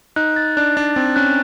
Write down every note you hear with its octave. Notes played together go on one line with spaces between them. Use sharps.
D#4 F#6
A6
D4 F#6
D4 A6
C4 A6
C#4 F#6